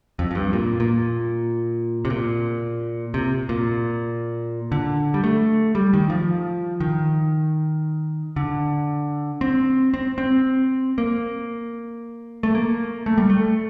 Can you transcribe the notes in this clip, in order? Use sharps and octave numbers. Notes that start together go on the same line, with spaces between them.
F2
F2
G2
A#2
A#2
C3
A#2
C3
A#2
D3
G3
A3
G3
D#3
F3
D#3
D3
C4
C4
C4
A#3
A3
A#3
A3
G3
A3